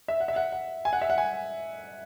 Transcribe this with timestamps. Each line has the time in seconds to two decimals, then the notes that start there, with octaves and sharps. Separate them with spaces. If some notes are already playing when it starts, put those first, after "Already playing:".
0.08 E5
0.20 F#5
0.28 E5
0.36 F#5
0.52 F#5
0.85 G#5
0.93 F#5
1.02 E5
1.10 F#5
1.18 G#5